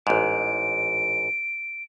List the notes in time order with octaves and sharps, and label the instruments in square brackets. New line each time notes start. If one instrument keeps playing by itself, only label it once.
[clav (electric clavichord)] A1 G#2 [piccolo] D7